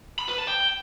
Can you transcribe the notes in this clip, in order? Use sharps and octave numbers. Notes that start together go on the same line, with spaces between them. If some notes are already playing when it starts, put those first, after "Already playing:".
B5
B4
A5
G5